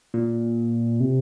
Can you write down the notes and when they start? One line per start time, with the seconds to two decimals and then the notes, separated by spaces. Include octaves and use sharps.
0.14 A#2
1.00 C3